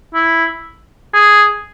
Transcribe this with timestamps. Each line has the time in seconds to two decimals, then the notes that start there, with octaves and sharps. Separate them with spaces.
0.14 E4
1.14 G#4